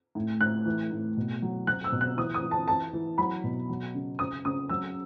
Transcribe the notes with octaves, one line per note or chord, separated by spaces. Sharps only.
A2
A2 F#6
E3
A2
B2
F#3
F#3 F#6
E6
B2
F#6
E3 D#6
D#6
E3
A5
E3 A5
E3
F#3 B5
B2
F#3
C#3
C#3 D#6
C#3 D#6
F#3 E6